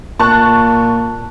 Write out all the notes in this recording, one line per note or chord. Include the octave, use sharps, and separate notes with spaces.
A#2 A5 C#6 F#6